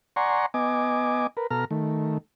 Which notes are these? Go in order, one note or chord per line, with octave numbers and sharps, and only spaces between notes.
D5 F#5 G#5 A#5 C6 C#6
B3 D#5 G#5 D6
A#4 B4
B2 A4 A#5 F6
D#3 A3